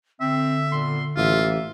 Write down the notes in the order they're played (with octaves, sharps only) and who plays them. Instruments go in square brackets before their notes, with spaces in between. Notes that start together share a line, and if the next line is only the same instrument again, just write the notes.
[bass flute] D3 [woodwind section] C4 [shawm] E5
[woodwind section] A#2 B3 C6
[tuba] A1 [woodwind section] A#3 G4 E5 [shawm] F4